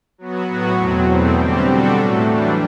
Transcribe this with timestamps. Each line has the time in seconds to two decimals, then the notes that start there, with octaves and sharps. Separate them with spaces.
0.18 F#3 B3 F#4
0.48 A2 F#3 B3 F#4
0.78 E2 B2 F#3 C4
1.07 E2 B2 A3 C4
1.37 D3 G3 C4 G4
1.67 G3 D4 F#4 A4
1.97 A2 F#3 A3
2.27 E3 G3 D4